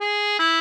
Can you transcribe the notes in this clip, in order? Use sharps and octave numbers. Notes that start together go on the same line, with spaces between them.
G#4
E4